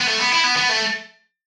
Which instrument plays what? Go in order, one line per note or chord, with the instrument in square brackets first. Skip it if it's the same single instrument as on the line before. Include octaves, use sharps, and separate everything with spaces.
[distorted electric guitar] B3
A3
B3
E4
B3
B3
A3